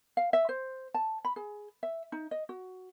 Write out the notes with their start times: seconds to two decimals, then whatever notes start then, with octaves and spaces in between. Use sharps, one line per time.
0.17 F5
0.33 E5
0.49 C5
0.94 A5
1.25 B5
1.36 G#4
1.83 E5
2.12 D#4
2.31 D#5
2.49 F#4